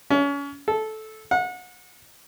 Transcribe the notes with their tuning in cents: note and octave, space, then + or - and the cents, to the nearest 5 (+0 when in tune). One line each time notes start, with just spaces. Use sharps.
C#4 +30
A4 -15
F#5 -30